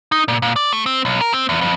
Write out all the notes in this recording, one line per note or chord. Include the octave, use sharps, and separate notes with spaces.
D#4
A#2
A#2
D5
A3
C4
B1
A#4
C4
E2
F2